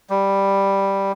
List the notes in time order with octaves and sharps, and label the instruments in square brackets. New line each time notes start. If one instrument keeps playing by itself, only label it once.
[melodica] G3